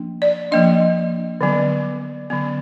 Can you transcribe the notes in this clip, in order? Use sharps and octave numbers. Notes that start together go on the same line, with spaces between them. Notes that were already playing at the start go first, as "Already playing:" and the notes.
Already playing: F3 A#3 D4
D5
F3 A#3 D4 D#5
D3 F#3 B3
D3 F#3 B3